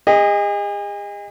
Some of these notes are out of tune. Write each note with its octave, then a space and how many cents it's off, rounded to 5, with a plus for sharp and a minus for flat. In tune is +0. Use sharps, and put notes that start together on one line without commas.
G#4 -40 D#5 +0